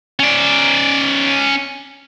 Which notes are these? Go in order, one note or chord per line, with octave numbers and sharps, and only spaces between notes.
C#4 D5